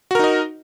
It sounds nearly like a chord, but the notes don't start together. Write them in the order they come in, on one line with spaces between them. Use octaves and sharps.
F#4 A#4 D#4 D#5